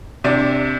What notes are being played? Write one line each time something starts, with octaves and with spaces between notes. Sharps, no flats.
C3 D4